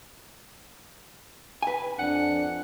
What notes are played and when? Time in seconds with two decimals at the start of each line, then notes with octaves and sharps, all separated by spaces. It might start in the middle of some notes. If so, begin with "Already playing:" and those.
1.62 B4 G#5
1.99 F2 D4 F#5